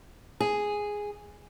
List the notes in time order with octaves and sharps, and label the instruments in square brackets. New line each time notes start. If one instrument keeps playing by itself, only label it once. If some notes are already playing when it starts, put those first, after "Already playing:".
[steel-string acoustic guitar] G#4